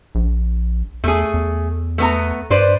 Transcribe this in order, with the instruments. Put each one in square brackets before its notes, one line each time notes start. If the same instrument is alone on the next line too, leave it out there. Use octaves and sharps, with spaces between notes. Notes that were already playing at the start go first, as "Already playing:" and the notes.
[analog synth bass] A#1
[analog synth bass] E2 [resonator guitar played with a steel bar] A3 G#4
[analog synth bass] E2
[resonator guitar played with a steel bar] A3 B3 A#5
[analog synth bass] G2 [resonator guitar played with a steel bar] B4 C5 D5